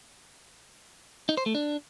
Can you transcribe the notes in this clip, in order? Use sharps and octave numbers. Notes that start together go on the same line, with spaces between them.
D#4
C5
A3
D4